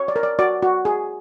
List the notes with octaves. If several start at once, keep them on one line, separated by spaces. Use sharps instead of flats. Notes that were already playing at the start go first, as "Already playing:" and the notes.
Already playing: C#5
D5
A#4
D5
F#4 D5
F#4
G#4